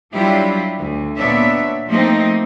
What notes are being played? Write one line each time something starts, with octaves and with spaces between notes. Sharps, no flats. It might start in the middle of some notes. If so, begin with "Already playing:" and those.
F#3 G3 D4 E4 F4 G4
D2
A#2 B3 D4 C#5 E5
F3 A3 A#3 C4 D#4